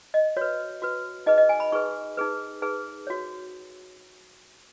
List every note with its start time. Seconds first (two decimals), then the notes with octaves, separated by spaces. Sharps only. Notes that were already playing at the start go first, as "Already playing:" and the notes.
0.14 D#5
0.37 F#4 B4 C#5
0.82 F#4 B4
1.26 D#4 G#4 B4 D#5
1.38 D#5
1.49 G#5
1.60 B5
1.72 D#4 G#4 B4 C#6
2.17 D#4 G#4 B4
2.62 D#4 G#4 B4
3.07 F#4 C#5